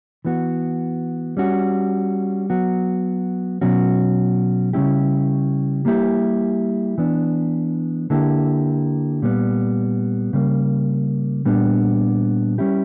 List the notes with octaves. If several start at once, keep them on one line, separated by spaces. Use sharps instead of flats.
E3 B3 F#4
G3 C#4 F#4
F#3 B3 F#4
B2 F#3 C#4 F#4
C#3 G3 C#4 E4 G4
G3 A#3 E4 G4
E3 B3 D4
D3 A#3 E4 G4
A#2 G3 B3
C#3 G3 A#3
A#2 G3 B3 D4
G3 C#4 E4 G4